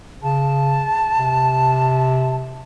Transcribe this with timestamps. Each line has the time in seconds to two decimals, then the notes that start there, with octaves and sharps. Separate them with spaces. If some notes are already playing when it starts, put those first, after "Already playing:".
0.23 C#3 A5
1.19 C3